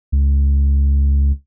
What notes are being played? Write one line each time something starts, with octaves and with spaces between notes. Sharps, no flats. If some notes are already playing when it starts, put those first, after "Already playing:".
C#2